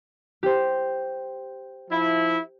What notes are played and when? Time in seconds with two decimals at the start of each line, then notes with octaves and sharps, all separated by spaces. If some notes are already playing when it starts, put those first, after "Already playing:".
0.43 G4 C5
1.90 F3 E4